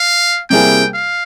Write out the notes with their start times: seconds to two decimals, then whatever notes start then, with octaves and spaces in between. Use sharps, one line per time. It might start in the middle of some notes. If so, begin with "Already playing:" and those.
Already playing: F5
0.50 C3 G3 A#3 E4 G#4 G5
0.94 F5